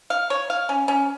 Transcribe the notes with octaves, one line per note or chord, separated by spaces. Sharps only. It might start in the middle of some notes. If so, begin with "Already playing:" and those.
F5
C#5
F5
C#4
C#4